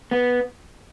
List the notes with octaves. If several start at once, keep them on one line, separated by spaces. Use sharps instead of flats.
B3